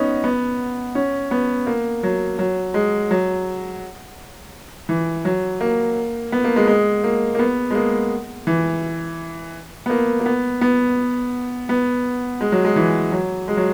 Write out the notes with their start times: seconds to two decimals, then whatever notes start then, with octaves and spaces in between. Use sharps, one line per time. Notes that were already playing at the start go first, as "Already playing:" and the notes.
Already playing: B3 C#4 D#4
0.24 B3
0.95 C#4
1.31 B3
1.67 A#3
2.03 F#3
2.39 F#3
2.74 G#3
3.11 F#3
4.89 E3
5.25 F#3
5.61 A#3
6.32 B3
6.44 A#3
6.56 G#3
6.67 G#3
7.04 A#3
7.35 A#3
7.39 B3
7.71 G#3
7.75 A#3
8.47 E3
9.86 B3
9.90 A#3
10.20 A#3
10.26 B3
10.61 B3
11.69 B3
12.41 G#3
12.52 F#3
12.65 G#3
12.76 E3
13.12 F#3
13.48 G#3
13.57 F#3